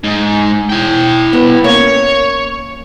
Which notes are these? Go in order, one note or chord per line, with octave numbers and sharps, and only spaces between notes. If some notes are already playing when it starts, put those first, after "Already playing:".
G#2
E4 G5
C2 B3
A#3 C#4 C#5